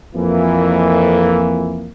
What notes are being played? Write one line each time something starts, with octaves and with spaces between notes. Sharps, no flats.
F2 E3 A#3